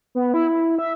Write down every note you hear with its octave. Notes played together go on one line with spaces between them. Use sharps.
B3
E4
E4
E5